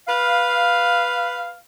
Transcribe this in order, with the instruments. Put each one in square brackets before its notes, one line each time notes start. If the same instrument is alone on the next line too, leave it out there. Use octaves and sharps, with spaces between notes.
[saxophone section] B4 F5